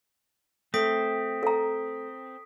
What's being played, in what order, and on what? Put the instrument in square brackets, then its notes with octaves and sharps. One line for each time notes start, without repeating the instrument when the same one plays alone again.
[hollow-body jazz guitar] A3 [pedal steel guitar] C4 [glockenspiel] D#6 B6 D7
[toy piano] A4 A#5